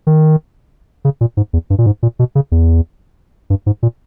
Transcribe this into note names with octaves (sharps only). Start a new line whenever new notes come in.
D#3
C#3
A#2
G#2
E2
G2
A#2
G#2
A#2
B2
C#3
E2
G2
G#2
A#2